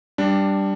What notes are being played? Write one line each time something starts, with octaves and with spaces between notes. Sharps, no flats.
G3 D4